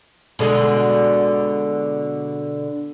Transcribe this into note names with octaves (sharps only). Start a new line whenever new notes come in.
B2 D3 G#3